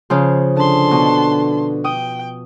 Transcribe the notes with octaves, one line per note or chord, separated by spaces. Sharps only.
C#3 F3
D3 A5 C6
B2
G5 D#6